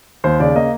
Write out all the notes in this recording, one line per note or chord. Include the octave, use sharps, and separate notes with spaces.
D#2 C5
C#3 D5
A#3 D#5